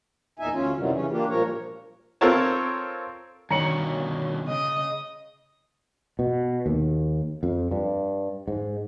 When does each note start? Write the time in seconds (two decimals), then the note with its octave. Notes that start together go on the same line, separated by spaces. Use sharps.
0.39 E2 A#2 D#4 E5 G#5
0.53 D2 C#4 F4
0.76 F#2 C3 D#3 E3 F#3 G3
0.92 C#3 E3 C#4
1.10 A#3 D4 F4 G4
1.29 G2 A#2 F3 A#4 C#5
2.21 C4 F4 A4 A#4 C#5 A5
3.50 G2 B2 D#3 C#5 A#5 C#7 F#7
4.45 C#3 D#5
6.19 B2
6.66 D#2
7.43 F2
7.71 G2
8.48 G#2